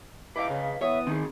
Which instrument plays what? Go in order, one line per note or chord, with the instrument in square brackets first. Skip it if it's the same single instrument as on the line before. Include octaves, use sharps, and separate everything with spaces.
[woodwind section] E4 G4 D6 [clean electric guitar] B4 D#5 F5
[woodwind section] C#3
[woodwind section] E3 B3 D#6 [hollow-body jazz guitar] C#5 [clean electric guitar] E5
[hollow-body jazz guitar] D#3 [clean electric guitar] C4 D#4 G#4